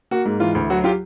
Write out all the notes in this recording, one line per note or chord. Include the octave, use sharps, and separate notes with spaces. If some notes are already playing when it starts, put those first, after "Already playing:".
A#3 F#4
G#2
E3 F4
D2
F#3 F#4
F4 G4